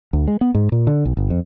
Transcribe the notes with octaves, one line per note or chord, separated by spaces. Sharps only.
D2
G#3
B3
G#2
A#2
D3
B1
G1
F2